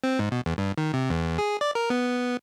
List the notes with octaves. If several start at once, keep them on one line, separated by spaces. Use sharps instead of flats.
C4
G#2
B2
E2
G2
D#3
C3
E2
G#4
D5
A#4
B3